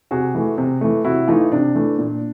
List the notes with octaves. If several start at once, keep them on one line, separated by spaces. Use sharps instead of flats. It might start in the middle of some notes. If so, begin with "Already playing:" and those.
C3 F#4 G#4
E3 A3
C3
E3 A3
C3 E4 F#4
E3 A3 D#4 F4
C3 D4
E3 A3
A#2